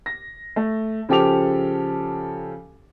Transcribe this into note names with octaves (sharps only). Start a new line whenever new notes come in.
A#6
A3
C#3 F3 G4 A4 D6 F7